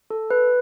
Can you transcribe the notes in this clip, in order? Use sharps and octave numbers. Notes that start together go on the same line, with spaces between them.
A4
B4